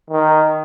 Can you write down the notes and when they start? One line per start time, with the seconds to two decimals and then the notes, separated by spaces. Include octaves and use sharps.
0.10 D#3